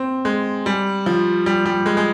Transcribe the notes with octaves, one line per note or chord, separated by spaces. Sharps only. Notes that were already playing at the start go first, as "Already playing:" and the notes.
Already playing: C4
G#3
G3
F3
G3
G3
G#3
G#3